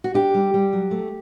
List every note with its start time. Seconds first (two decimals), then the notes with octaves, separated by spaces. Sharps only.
0.04 F#4
0.14 D4 G4
0.34 G3
0.54 G3
0.73 F#3
0.91 A3